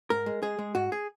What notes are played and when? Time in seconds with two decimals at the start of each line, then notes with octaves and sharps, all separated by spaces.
0.10 G#2 A#4
0.26 G#3
0.43 G#3 G#4
0.59 G#3
0.75 G#2 F#4
0.92 G#4